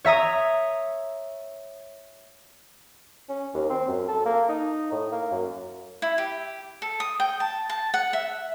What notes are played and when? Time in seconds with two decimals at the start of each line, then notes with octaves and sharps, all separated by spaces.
0.05 C#5 E5 A#5 D#6
3.29 C#4
3.54 D#2
3.70 C4
3.88 F#2
4.08 A4
4.26 A#3
4.49 D#4
4.92 A2
5.12 A#3
5.32 F#2
6.02 E4
6.18 G4
6.82 A4
7.00 D#6
7.20 G5
7.40 A5
7.70 A5
7.94 F#5
8.13 E5